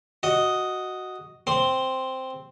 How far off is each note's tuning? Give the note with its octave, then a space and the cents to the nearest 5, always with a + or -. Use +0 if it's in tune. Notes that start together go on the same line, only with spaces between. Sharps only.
F#4 +0 D#5 +0
C4 +0 C6 +0